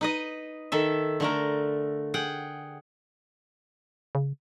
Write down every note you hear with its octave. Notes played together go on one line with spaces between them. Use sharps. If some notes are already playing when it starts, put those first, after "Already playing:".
D#4 B4 D#5
D#3 A4 E5
D3 A3 A#4
G#4 F#5 G5
C#3